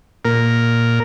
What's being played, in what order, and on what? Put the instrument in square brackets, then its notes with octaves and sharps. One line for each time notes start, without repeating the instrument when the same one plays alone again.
[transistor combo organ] A#2 A#4